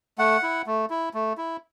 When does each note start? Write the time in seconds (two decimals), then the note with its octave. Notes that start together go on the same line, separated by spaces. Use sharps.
0.18 A3 F#5
0.43 E4
0.66 A3
0.90 E4
1.14 A3
1.38 E4